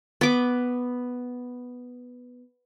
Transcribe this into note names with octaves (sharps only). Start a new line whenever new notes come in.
B3 D6